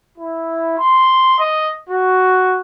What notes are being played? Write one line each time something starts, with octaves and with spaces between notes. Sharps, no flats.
E4
C6
D#5
F#4